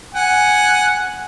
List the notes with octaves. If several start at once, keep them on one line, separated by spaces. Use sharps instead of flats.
F#5 G#5